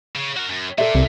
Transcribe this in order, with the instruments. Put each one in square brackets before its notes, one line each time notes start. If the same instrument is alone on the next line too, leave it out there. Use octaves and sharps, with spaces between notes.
[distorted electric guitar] C#3
F#4 A#4
F#2
[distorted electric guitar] A#2 [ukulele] A4 D5 E5
[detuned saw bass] C2